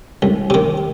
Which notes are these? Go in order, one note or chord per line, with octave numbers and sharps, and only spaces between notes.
C2
C3 D#3